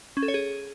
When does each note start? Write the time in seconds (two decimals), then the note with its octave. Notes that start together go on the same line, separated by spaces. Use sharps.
0.17 C#4
0.23 A4
0.28 C#5
0.34 G#4